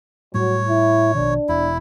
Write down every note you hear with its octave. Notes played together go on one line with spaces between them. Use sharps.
A2 F#3 G3 C#5
E4
A#1 B2 D#3 D4
E1 E4